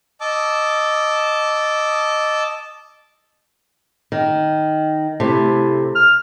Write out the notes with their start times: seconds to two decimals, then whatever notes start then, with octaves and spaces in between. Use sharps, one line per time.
0.21 D#5 A5 D6 E6
4.12 D#3
5.20 C3 A3 E4
5.95 F6